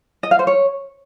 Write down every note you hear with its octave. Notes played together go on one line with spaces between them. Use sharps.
D#5
F5
C5
C#5